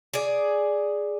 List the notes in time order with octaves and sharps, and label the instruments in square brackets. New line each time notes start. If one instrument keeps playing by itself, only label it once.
[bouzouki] G#4 D5